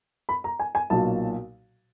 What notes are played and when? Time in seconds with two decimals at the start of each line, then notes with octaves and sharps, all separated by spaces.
0.29 B5
0.44 A#5
0.59 G#5
0.75 G#5
0.90 B1 A#2 F#3 A5